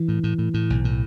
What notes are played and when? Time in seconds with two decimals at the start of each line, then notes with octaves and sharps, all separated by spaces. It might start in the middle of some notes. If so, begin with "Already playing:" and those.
Already playing: E3
0.08 A2
0.23 A2
0.38 A2
0.54 A2
0.70 B1
0.85 A2